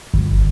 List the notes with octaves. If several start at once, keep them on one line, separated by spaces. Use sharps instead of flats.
G1